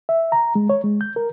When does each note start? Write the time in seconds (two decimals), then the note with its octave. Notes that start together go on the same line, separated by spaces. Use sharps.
0.09 E5
0.32 A#5
0.55 G#3
0.70 C#5
0.84 G#3
1.01 G6
1.16 A#4